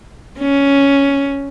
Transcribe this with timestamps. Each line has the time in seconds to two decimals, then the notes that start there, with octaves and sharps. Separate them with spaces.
0.40 C#4